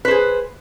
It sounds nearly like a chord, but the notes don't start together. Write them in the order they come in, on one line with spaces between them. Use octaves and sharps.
B4 C5 G#4